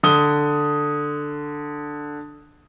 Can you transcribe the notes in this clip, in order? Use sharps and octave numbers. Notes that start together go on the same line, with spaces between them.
D3 D#6 G7